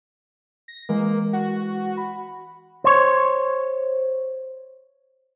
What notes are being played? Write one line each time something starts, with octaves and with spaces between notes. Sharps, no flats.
A#6
E3 G#3 A#3
F#4
B5
C5 C#5